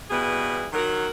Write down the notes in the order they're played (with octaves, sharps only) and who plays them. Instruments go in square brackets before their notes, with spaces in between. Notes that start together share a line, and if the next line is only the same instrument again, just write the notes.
[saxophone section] B2 G3 E4 G#4 B4
D#3 F#3 F#4 A#4